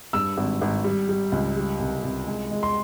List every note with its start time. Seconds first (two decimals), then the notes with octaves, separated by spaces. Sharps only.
0.13 G2 E6
0.37 G#1
0.61 G#1
0.84 G3
1.09 G3
1.32 C#2
1.56 G3
1.79 C2
2.03 C2
2.27 G#3
2.51 G#3
2.63 C6